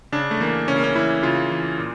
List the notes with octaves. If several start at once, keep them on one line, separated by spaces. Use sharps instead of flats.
C#3 D4
A3
E3 A#3
C#3 C#4
A#3
C#4
E3 E4
C#3 F4
E3
A#2